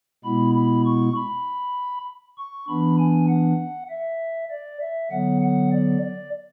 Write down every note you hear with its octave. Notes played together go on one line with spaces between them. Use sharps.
B2 G#3 B3 E4 B5
B5
C#6
B5
C#6
E3 B3 D4 B5
G#5
F#5
E5
D5
E5
D3 F#3 B3 F#5
F#5
D5
D5